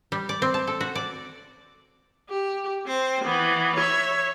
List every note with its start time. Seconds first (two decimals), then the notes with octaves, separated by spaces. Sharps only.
0.12 G3
0.29 D5
0.42 C4
0.54 A5
0.67 A4
0.80 F#4
0.95 D5
2.29 G4
2.87 C4 C5
3.24 E3 B3
3.76 C#5 E5